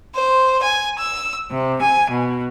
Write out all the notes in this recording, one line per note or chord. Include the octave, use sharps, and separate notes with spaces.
C5
G#5
E6
C3
G#5
B2